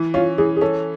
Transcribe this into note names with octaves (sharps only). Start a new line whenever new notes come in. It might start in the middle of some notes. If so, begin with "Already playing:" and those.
Already playing: E3
C#4 F4
E3 G#4
G#4
C#4 A4